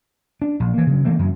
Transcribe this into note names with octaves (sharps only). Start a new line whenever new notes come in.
D4
A#1
E3 A#3
C#3 F#3
E3 A3 A#3 C4
F#2 F#3